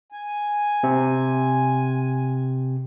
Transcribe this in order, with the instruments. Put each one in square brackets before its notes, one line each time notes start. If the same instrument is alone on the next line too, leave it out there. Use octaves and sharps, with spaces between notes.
[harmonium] G#5
[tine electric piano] C3